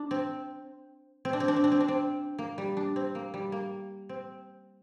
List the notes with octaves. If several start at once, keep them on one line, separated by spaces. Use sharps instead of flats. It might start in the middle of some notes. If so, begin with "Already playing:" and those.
Already playing: D4
C4
C4
D4
C4
D4
C4
D4
C4
D4
C4
A#3
G3
D4
C4
A#3
G3
A#3
C4